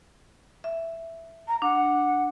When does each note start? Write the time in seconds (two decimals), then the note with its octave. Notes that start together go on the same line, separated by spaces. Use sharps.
0.64 E5
1.48 A#5
1.62 D4 F#5